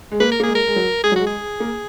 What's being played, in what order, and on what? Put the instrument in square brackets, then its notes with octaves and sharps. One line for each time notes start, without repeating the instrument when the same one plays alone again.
[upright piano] G#3
[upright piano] A#3 [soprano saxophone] B4
[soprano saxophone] A#4
[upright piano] A#3
[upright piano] G#3 [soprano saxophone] G#4
[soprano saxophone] A#4
[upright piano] G#3
F#3
[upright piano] G#3 [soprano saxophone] G#4
[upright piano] F#3
[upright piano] G#3 [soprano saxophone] F#4
[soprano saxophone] G#4
[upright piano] A#3